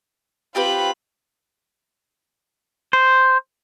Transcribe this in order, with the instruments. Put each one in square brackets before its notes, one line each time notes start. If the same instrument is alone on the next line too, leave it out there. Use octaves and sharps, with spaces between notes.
[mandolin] C4 G4 B4 [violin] F4 B5
[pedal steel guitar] C5